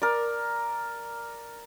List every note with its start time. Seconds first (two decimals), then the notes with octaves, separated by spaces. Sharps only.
0.02 A#4 D5